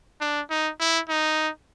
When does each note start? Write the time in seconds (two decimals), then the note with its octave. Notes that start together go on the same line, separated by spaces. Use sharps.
0.21 D4
0.50 D#4
0.80 E4
1.09 D#4